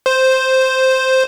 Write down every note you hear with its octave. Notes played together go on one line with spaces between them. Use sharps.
C5